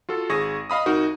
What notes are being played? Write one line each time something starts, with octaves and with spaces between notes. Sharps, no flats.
F4 F#4 A4
G#1 G#4 C#6 D#6 A#6
D#5 F5 B5 D#6
C2 D#4 F#4 A#4